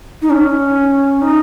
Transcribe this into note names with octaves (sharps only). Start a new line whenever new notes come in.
D#4
C#4
D#4